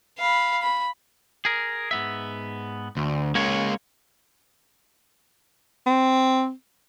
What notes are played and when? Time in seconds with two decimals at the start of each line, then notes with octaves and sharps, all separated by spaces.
0.19 F5 B5
0.62 B5
1.45 G#4 A#4
1.91 G#2 B3 E5
2.97 D2
3.35 G#3 A#3 C#4 C#5
5.86 C4